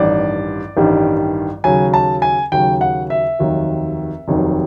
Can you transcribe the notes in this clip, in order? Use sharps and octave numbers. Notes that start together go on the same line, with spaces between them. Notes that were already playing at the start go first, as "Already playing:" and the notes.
Already playing: A1 G2 D#3 G3 D5
A1 G2 D#3 G3
D#2 C#3 F#3 G#5
A5
G#5
D#2 C#3 F#3 G5
F#5
E5
F1 D#2 D#3 F#3
F1 D#2 D#3 F#3